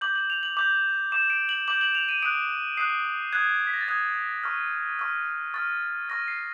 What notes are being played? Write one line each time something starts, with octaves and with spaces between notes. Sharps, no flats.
D6 G6 F#7
F#7
F7
F#7
D6 G6 F7
D6 G6 E7
D7
F#7
D6 G6 F#7
F#7
F7
D#7
D#6 F#6 D7
D#6 F#6 C7
D#6 F#6 G#6
B6
A#6
A6
D#6 F#6 G#6
C#6 F6
C#6 F6
C#6 F6 A6
C#6 F6 A#6
C7